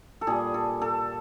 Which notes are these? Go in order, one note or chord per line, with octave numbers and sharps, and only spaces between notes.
A4
A#2 G3 G#4
A4
A4